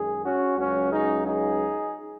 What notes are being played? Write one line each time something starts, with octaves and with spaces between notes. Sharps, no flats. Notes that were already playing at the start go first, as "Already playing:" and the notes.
Already playing: F#2 D#3 G#3 G#4
C#4 F#4
C#2 C#3 F#3 C#4 F#4
D#4 G#4
D#4 G#4